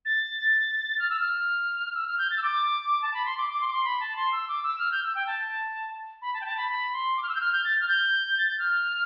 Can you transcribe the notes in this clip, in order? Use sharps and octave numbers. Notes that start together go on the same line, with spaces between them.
A6
F6
E6
F6
E6
F6
G6
A6
E6
D6
A5
B5
C6
D6
D6
C6
D6
C6
B5
A5
C6
E6
D6
E6
F6
G6
E6
G5
A5
B5
A5
G5
A5
B5
B5
C6
D6
F6
E6
G6
F6
G6
A6
F6
G6
A6
G6
F6